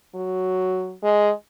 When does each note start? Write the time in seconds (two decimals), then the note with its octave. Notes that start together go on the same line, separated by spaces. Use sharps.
0.15 F#3
1.03 G#3